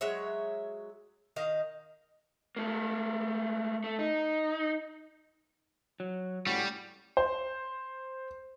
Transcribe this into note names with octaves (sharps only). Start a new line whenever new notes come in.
F#3 G#3 C#5 E5
D#3 D#5 F5
A3 A#3
A3
D#4
F#3
A2 G3 C#4 F#4
C5